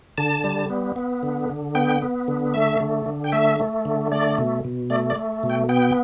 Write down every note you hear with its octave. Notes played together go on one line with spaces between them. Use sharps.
D3 A5
G3
B3
B3
D3
D3
B3 G5
B3
D3
A3 E5
D3
D3
G5
A3 E5
A3
D3
A3 D5
B2
B2
A3 D5
D5
A3
B2
G5
B3 G5